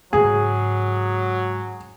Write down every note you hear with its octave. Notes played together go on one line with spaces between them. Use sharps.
G#2 C#3 F#3 G#4